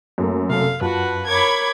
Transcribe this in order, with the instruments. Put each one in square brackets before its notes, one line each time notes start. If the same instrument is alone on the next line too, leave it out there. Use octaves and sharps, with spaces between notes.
[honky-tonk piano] F#2 A3 A#3
[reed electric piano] C3 A4 [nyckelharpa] F5
[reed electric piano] F#2 [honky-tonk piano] F4 F#5 A5 [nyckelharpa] F#4 B4
[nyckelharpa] A#4 C#5 [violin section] B5 D6 G#6